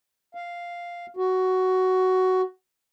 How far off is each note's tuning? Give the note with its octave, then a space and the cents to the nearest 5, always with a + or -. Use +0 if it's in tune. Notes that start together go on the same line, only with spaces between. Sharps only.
F5 +0
F#4 +10